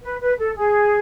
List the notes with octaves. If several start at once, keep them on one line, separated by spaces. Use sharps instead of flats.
B4
B4
A4
G#4